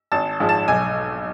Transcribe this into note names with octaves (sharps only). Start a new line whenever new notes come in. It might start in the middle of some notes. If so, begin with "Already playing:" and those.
G#1 A5
G#2 F3 G#3
A5
B1 G#5